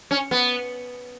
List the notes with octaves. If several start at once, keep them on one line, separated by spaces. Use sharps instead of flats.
C#4
B3